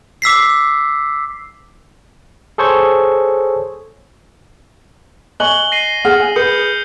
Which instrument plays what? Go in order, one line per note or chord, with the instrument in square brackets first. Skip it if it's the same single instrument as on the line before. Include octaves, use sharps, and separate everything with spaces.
[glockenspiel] D6 E6 B6 C7
[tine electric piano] G#4 A4 C5 C#5 C#6
[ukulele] D#5 [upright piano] G#5 C#6 F#6 [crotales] F#7 G7
[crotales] A#6 C7 D#7
[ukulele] G#4 F#5 [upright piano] F6
[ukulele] G#5
[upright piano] G#4 B4 [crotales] D#6 G6 C#7